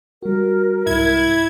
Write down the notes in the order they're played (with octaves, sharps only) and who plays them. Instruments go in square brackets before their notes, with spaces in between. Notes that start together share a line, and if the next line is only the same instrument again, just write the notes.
[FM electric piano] G3 F#4 [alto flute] A#4
[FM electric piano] C2 G#2 [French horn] E4 [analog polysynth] G#6